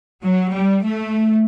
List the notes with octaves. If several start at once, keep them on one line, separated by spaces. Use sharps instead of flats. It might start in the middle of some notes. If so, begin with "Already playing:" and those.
F#3
G3
A3